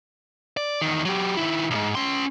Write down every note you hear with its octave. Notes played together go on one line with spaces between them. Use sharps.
D5
E2 D#3
F#3 G4
D#3 E4
B1 G#2
C#4 C6